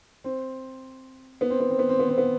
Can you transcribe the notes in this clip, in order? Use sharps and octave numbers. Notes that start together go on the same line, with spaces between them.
C4
B3
C4
B3
C4
B3
C4
B3
C4
B3